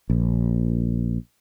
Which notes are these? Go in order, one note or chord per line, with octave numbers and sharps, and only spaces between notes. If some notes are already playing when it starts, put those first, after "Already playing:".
A#1